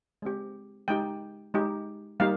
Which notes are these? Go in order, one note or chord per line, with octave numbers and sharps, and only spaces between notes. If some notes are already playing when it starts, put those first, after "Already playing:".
G#3 C4 G4
G#3 D#4 G4 G5
G#3 D#4 G4
G3 A#3 D#4 G4 F5